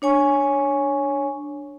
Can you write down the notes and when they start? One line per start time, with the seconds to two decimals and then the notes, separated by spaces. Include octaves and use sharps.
0.02 D4 C#5 G#5 C#6